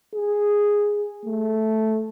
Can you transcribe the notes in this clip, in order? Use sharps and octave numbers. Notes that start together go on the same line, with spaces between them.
G#4
A3